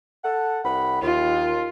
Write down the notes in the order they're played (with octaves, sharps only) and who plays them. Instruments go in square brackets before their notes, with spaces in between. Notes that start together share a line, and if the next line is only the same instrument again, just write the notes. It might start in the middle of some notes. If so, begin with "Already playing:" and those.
[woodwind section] A4 F#5
C2 F#5 B5
[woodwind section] D#2 [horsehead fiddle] F4